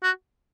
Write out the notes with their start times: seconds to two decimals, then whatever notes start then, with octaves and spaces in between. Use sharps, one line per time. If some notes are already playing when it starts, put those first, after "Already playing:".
0.03 F#4